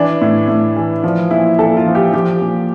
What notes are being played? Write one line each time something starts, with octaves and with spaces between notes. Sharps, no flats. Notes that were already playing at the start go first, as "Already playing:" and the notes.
Already playing: E3 D4
A2
A2
E3
F3
A#2 E4
A#2 A4
F4
F3
G4
F3 G4
A#2